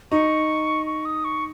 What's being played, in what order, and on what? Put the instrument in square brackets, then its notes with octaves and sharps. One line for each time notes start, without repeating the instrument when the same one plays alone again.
[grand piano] D#4 [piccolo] C#6
[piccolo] C#6
D#6
C#6